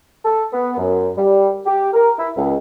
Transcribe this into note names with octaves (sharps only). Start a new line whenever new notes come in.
A4
B3
F#2
G3
G4
A#4
E4
C#2